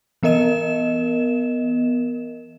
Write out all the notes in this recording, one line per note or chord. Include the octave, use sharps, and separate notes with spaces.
E3 B3 A#4 D#5 E7